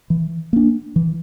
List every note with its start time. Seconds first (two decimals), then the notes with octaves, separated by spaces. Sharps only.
0.10 E3
0.53 A#3 D4
0.96 E3